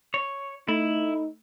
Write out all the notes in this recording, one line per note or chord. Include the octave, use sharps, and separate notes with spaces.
C#5
A3 D#4 E4